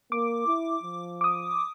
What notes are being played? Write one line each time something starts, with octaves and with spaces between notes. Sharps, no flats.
A#3 D6
E4
F3
D6 D#6